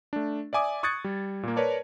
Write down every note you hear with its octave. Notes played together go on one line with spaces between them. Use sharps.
A3 D4
D5 E5 G#5 D6 D#6
C#6 D#6 F#6 G#6 A6 C#7
G3
A#2 A#3
A#4 B4 C#5 D5 A5